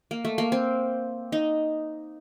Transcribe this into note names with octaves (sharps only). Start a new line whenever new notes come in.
A#3
A3
A#3
C4
D#4